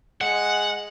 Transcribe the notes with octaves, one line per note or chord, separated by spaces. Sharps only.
G#3 F#5